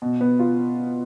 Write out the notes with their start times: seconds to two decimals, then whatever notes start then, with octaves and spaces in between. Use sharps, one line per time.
0.02 B2
0.21 B3
0.39 F4